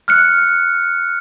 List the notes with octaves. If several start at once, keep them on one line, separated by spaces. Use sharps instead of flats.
F6 F#6 C#7